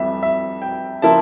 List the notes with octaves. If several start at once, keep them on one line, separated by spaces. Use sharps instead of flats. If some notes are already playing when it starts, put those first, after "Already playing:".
Already playing: F2 E3 G3 E5
E5
G5
C#3 F3 A#3 E4 A5